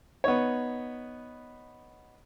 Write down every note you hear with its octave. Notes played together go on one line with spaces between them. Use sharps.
B3 D#4 C#5